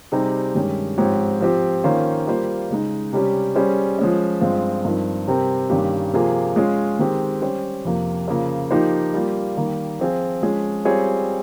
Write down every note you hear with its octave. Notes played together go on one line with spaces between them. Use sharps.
C3 G3 C4 D#4 G#4
G2 D#3 G#3 C#4 G4
G#2 F3 C4 G4 C#5
F3 C4 G4
D#3 A#3 C#4 F4 C5
G3 A#3 F4 C5
C#3 G#3 D#4
C3 G3 C#4 G4
G3 C#4 G#4 C5
F3 G#3 C#4
G2 F3 G#3 C4 F4
G2 F3 C4 D#4 A#4
C3 G3 C4 G4 A#4
G2 D#3 A#3 C#4 G4
C3 F3 A#3 F4 G#4
G#3 C#4 F4 G#4
D#3 G#3 C4 G4
G3 C#4 G4 C5
F2 C3 F3 A#3
C#3 F3 A#3
F3 A#3 D#4 G4 C5
G3 A#3 F4
D#3 G3 A#3
F3 C4 F4 G#4
F3 G#3 C#4 G#4
G3 C4 F4 G#4 C#5